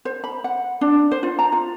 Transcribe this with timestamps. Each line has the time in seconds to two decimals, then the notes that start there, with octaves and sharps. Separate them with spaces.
0.05 C5
0.24 B5
0.44 F#5
0.81 D4
1.11 C5
1.23 F4
1.39 A#5
1.52 F4